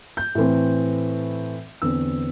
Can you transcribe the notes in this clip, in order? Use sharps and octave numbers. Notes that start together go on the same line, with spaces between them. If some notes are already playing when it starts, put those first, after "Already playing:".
G6
A2 E3 C4
E2 D3 C4 E6